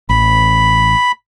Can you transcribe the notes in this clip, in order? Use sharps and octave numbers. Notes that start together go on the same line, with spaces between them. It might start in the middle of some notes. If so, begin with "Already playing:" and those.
A1 B5